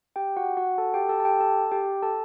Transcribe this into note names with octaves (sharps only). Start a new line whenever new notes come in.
G4 G5
F#4 F#5
F#4 F#5
A4 A5
G4 G5
A4 A5
A5
G4 G5
A4 A5
G4 G5
A4 A5